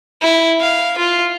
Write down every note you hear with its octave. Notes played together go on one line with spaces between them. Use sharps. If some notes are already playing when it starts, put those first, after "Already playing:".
E4
F5
F4